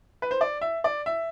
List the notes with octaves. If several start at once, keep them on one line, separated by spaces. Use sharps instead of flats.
B4
C5
D5
E5
D5
E5